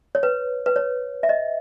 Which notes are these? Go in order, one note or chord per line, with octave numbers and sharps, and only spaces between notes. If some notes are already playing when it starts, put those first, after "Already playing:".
C#5
B4
B4
C#5
E5
D#5